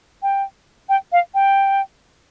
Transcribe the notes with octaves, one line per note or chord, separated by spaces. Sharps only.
G5
G5
F5
G5